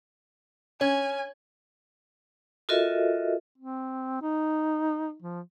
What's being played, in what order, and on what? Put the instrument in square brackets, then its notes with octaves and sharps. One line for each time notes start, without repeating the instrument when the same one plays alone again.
[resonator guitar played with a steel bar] C#4 [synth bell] C#5 [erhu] G#5
[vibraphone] F4 F#4 A4 A#4 D#5 E5
[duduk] C4
D#4
F3